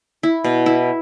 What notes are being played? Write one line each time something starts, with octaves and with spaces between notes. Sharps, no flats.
E4
B2
E4